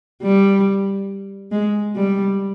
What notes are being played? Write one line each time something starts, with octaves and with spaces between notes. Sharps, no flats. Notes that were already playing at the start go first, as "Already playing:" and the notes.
G3
G#3
G3